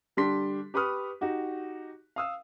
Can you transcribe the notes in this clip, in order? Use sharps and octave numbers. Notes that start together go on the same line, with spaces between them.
D3 G3 D4 G4 C6 B6
G4 B4 B5 C#6 D#6 F6
D#4 F#4 G4
F5 D#6 E6